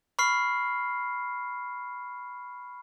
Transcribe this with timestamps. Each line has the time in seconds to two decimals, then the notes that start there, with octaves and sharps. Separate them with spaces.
0.19 B5 C#6 F6 C7